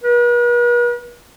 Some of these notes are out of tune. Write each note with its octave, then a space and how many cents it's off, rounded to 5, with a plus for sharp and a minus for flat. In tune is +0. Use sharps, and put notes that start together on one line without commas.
B4 -45